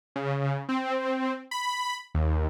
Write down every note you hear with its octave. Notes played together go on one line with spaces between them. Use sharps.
C#3
C4
B5
D#2